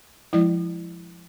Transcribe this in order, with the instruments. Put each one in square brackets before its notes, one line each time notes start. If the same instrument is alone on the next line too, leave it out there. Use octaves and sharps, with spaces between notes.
[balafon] F3 G#3 E4